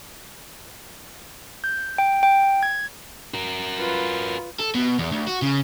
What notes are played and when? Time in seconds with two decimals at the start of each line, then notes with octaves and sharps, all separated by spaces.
1.64 G6
1.98 G5
2.23 G5
2.63 G#6
3.34 F#4 A#4
3.77 F4 B4
4.60 A4
4.75 B2
4.99 E2
5.11 D2
5.27 F#4
5.42 C#3